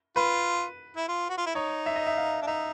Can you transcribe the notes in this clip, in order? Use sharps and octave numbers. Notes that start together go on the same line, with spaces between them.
F4 B4
E4
F4
F#4
F4
E4
D#4 C#5
E5
D#5
E5
F5
D4
D#4 E5